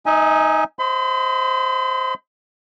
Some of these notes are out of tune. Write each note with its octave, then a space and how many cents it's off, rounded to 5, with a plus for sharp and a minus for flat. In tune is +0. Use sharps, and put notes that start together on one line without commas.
D#4 +0 E5 -40 G#5 +0
C5 +0 D#5 +25 B5 +45